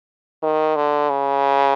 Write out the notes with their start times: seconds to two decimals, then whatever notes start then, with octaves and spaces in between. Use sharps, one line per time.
0.42 D#3
0.76 D3
1.10 C#3